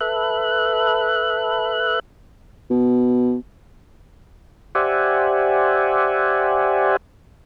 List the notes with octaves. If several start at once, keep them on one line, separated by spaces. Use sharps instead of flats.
A4 B4 E5 F#6
B2
G4 C5 D5 E5 F#5 G#5